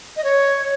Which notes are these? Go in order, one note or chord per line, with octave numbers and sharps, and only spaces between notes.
D#5
C#5